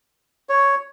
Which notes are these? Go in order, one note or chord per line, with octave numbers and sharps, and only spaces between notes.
C#5